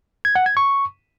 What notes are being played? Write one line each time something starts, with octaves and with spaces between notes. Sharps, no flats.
G#6
F#5
G#6
C#6